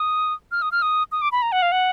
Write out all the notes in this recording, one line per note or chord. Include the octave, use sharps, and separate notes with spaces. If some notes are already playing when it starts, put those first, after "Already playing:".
Already playing: D#6
F6
D#6
F6
D#6
D#6
D6
B5
A#5
F#5
F5
F#5